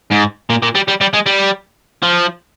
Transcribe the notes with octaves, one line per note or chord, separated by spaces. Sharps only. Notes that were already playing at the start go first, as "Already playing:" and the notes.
G#2
A#2
A#2
G3
G3
G3
G#3
G3
F3